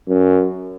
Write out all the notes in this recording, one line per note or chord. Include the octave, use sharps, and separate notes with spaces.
F#2